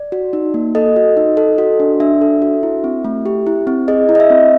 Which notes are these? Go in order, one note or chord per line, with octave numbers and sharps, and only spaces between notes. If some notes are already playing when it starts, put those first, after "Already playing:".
Already playing: D5
F#4
D#4
A#3
A4 D#5
F#4
D#4
A4
F#4
D4
D4 E5
A4
F#4
E4
C4
A3
G4
E4
C4
G#4 D#5
E4
D#5
E5
C4